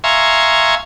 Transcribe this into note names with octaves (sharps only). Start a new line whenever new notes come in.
E5 F5 G#5 A#5 C6 C#6